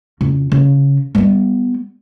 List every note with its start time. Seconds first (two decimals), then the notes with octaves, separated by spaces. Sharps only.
0.21 F2 C#3
0.52 C#3
1.15 G3 B3